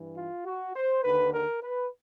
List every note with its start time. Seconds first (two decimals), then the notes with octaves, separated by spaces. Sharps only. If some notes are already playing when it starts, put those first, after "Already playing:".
Already playing: G2 E3
0.16 F4
0.45 F#4
0.74 C5
1.03 D#2 D3 B4
1.32 A#4
1.62 B4